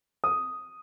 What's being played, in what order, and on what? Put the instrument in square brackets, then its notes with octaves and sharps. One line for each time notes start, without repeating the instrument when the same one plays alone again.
[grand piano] D#6